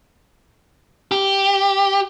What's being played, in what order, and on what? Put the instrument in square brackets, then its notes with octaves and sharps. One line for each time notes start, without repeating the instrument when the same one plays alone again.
[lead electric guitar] G4